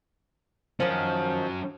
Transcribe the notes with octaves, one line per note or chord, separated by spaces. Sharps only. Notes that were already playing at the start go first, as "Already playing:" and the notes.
D#3 F3 F#3 C#4